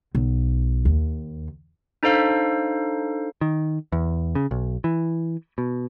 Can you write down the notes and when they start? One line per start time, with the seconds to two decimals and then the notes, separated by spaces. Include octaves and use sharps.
0.15 B1
0.85 D#2
2.03 D4 D#4 A4 C5 F5
3.41 D#3
3.92 E2
4.35 C#3
4.51 B1
4.84 E3
5.58 B2